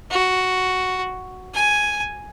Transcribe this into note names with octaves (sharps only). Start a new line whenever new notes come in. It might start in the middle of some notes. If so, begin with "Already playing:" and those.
F#4
G#5